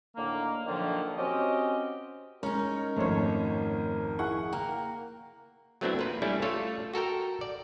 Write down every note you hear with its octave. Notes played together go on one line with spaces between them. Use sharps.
A2 D3 D#3 A#3
A#2 D3 D#3 F3 F#3 A#3
C4 C#4 F#4 G4 D#5
G#3 C#4 D#4 A#4 C#5 A#5
G#1 F2 A3 C5 C#5
E4 G#4 F#5 C#6
A#3 G5 A#5 F6
F#3 A3 B3 C4 D4 E4
A#3 F4 B4
G3 A3 C#4 D4 E4
A3 F4 A4 C#5
F#4 A4 A#4 G5
D5